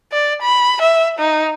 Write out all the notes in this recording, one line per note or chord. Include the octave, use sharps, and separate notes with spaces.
D5
B5
E5
D#4